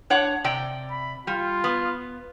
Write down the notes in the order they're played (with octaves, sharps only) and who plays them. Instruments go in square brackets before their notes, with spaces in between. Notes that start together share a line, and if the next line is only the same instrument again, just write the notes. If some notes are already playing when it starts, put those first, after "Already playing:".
[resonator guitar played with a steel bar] D4 C#5 F#5
C3 D5 G5
[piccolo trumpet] B5
[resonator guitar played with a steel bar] G3 [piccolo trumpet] F4
[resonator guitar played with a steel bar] B3